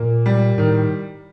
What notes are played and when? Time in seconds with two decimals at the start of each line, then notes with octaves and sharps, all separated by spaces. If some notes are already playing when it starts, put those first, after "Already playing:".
Already playing: A#2 A#3
0.26 G3
0.58 A2 D#3